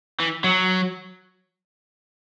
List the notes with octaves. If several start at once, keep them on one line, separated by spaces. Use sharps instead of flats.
E3
F#3